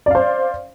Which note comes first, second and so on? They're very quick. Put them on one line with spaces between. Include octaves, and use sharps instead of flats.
D5 F5 C5